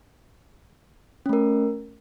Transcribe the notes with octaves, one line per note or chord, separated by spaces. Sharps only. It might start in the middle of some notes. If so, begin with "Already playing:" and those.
A3 C#4 A#4